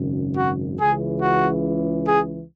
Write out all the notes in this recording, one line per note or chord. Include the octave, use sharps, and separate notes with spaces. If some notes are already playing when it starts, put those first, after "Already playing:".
Already playing: G#1 F#2 C#3
F#4
C#2 C#3 E3 G#4
F#4
G#4